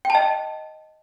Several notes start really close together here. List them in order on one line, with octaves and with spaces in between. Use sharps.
G5 A5 D#5